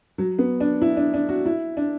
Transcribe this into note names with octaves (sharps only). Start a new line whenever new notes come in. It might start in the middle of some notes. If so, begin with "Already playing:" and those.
F#3
B3
D4
E4
D4
D4
F#4
E4
D4